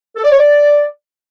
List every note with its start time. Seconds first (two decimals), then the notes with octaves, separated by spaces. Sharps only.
0.16 A4
0.23 D5
0.31 C#5
0.39 D5